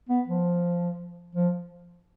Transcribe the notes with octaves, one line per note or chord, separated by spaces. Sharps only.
B3
F3
F3